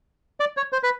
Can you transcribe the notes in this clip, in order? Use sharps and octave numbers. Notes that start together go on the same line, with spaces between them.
D5
C#5
C5
B4